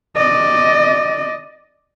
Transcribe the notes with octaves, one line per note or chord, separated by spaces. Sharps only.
D5 D#5